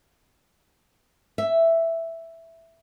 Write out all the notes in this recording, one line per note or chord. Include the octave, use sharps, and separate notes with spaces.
E5